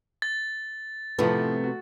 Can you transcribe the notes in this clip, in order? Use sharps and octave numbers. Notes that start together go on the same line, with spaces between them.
A6
A2 C3 F3 A3 B3
F#4